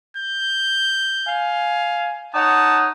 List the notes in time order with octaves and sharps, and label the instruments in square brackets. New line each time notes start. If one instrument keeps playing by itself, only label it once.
[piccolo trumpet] G6
[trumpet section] F5 G#5
[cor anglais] D#4 [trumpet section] C#5 F#5 [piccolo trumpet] A5